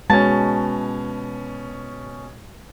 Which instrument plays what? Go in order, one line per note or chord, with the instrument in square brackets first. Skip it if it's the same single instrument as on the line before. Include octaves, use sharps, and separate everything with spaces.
[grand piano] B2 C#4 [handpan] G#3 [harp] A5